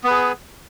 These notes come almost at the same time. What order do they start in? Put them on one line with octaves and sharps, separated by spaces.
B3 B4 G#4